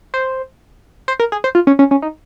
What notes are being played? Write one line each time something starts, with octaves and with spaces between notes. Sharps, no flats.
C5
C5
A#4
G#4
C5
F4
C#4
C#4
C#4
D#4